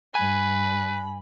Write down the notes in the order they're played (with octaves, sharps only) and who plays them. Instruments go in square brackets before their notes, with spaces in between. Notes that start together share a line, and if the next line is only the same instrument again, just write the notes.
[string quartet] G2 B5 [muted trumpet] B4 [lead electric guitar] G#5